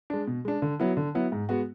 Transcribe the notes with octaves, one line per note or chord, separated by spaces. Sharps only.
G#3 D4
B2
G#3 D4
D3
F#3 B3 E4
D3
F#3 B3 E4
G#2
G#3 B3 F#4